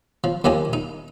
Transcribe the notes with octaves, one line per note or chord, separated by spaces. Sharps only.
F3
D#2 F3 G4 D#5 G#5
D#4